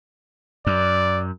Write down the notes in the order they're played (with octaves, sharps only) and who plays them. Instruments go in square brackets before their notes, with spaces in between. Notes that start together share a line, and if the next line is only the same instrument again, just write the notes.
[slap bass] F#2 [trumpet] D5